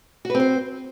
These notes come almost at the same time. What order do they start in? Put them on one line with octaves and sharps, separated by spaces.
F#4 B4 C4 C5